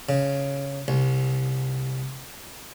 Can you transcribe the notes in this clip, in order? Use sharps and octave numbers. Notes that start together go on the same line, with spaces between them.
C#3
C2